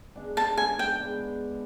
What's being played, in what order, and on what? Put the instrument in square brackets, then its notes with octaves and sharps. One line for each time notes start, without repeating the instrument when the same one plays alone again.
[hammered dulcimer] G#3 B3 D4
[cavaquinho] A5
G#5
G5
[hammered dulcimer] G#3 B3 D4